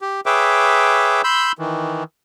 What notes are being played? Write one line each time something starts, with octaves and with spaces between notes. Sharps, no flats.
G4
G#4 B4 C#5 E5 G5 D6
B5 C6 E6 G6
D#3 E3